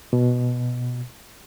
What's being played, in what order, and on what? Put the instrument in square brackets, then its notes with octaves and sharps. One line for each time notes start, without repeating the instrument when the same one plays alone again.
[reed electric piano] B2